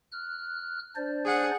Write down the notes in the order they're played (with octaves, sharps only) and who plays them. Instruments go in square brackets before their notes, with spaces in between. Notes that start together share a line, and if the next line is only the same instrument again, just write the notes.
[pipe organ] F6 F#6
D4 C5 D5
[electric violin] G#4 F#5